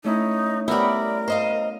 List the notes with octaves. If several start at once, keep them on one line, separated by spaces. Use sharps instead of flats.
A3 C#4 D#4 E4
G3 B3 A#4 D5 E5
C5 D#5 F5